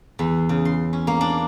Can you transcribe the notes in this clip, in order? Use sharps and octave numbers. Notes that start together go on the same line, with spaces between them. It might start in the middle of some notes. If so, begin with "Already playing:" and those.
E2
C#3
C6
C#4
A#3
D4